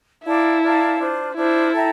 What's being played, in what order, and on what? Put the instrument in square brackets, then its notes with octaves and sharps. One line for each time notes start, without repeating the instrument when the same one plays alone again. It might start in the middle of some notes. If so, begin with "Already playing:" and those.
[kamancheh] E4 [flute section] A#4 D5 F5 A5
[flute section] A#4 D5 F5 A5
D4 F4 C5
[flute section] D4 F4 C5 [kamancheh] E4
[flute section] A4 E5 G5 A#5